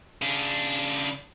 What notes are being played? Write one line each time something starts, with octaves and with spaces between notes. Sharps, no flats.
C#3 D4